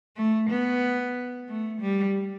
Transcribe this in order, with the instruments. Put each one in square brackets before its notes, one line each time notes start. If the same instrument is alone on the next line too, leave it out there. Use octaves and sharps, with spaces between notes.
[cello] A3
B3
A3
G3